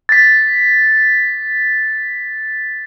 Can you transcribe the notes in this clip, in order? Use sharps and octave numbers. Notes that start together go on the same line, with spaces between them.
A6 B6